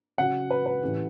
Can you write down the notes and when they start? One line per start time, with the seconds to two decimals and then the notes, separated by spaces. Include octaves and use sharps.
0.18 C#3 F#3 C#4 F#4 F#5
0.50 B4
0.66 B4
0.82 A2 E3 A3 C#4 G4